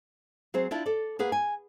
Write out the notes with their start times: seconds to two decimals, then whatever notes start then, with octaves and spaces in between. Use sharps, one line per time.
0.54 F#3 C4 G#4 C5
0.71 D4 E4 F4 A5
0.86 A4 D5
1.19 A#3 G#4 B4 F#5
1.32 G#5